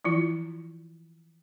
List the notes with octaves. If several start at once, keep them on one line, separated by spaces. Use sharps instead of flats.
E3 F3 E4 F4